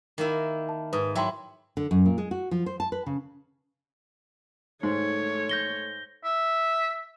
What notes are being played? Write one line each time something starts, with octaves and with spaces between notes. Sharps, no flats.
D#3 A#3 E4
A5
G#2 B4 D#6
F#3 E4 E5 G5 C6
D3
F#2
A#2
G#3
F#4
F3
C5
A5
B4
C#3
G#2 A3 C#5
G6 A#6 G7
E5